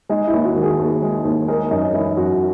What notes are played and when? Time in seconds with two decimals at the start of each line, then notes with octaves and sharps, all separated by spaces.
0.09 G#3 D#4
0.27 E4
0.33 D#2
0.45 F#4
0.56 D#3
0.62 G#4
0.79 D#2
1.02 G#3
1.25 D#2
1.48 G#3 A#4
1.71 F#2 D#4
1.93 E3 E4
2.17 F#2 F#4